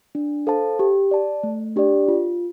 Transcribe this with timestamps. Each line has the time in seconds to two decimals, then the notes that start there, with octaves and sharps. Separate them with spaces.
0.15 D4
0.47 A4 C5 F5 A5
0.79 G4
1.11 D5 A5
1.43 A3
1.76 D4 G4 D5
2.08 F4